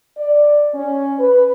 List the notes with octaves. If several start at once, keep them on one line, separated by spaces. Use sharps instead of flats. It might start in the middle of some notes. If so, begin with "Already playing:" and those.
D5
C#4
B4